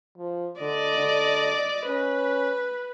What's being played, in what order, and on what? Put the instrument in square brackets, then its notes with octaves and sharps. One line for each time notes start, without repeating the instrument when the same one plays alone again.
[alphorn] F3
[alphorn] D3 [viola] D5 D#5
[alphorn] D3
[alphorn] C#4 [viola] B4